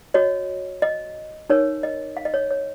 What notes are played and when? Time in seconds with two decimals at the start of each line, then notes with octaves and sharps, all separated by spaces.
0.14 F#4 C#5 D#5
0.82 D#5
1.50 D#4 A#4 C#5
1.83 D#5
2.17 F5
2.25 D#5
2.34 C#5
2.51 C#5